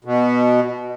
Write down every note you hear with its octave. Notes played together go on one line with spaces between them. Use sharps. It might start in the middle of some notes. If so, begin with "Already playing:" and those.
B2